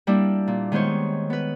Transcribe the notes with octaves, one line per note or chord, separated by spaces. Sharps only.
G3 A#3 D4 E4
A#2
D#3 G#3 B3 C5 C#5
B3 B4